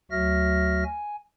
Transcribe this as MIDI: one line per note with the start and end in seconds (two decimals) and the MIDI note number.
0.11 0.84 38
0.11 0.84 54
0.11 0.84 66
0.11 0.84 76
0.11 0.84 89
0.11 0.84 94
0.84 1.16 80